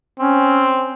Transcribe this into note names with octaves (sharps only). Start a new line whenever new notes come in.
C4 C#4